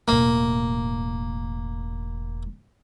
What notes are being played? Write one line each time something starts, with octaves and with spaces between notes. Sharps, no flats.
E1 A2 A#3